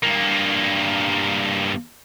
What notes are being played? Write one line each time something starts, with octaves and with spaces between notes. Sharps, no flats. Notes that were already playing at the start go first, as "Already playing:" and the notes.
G2 A#3